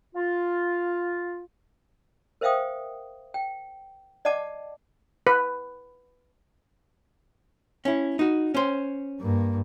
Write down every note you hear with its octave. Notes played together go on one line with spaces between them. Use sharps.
F4
A#4 C5 E5 F5 G5 D#6
G5
D5 D#5 F#5 A5 D6
B4
C#4 E4
D#4 F#4
C#4 C5
G2 A#3